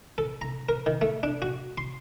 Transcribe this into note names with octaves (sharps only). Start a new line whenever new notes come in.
A4
A#5
A#4
D#3
A3
D4
F#4
C6